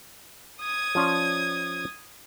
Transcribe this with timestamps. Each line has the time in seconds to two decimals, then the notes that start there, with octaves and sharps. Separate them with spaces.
0.61 D#6 G#6
0.95 F3 C#4 D5